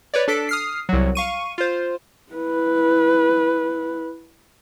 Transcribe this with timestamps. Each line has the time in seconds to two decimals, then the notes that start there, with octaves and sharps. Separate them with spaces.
0.14 B4 C#5 D5
0.28 D4 A4 B6 D7
0.49 D#6 F6 C7
0.89 C2 F#3
1.15 F5 C#6 D#7
1.58 F4 C5
2.33 E4 B4